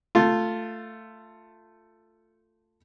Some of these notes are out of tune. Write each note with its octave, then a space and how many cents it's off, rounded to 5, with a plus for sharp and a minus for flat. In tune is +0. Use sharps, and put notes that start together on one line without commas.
A3 +10 F4 +0